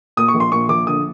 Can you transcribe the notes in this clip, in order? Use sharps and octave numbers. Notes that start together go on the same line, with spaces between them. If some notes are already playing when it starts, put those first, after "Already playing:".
A#2 D#6
C#6
A#1
C6
A#2 C#6
A#1 D6
D3 D#6